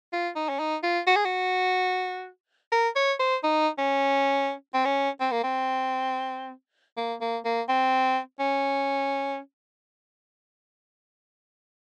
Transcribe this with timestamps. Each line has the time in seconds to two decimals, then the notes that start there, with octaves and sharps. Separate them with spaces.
0.13 F4
0.35 D#4
0.49 C#4
0.60 D#4
0.83 F4
1.07 F#4
1.16 G#4
1.25 F#4
2.72 A#4
2.96 C#5
3.19 C5
3.43 D#4
3.78 C#4
4.74 C4
4.85 C#4
5.20 C4
5.32 A#3
5.43 C4
6.97 A#3
7.21 A#3
7.45 A#3
7.69 C4
8.39 C#4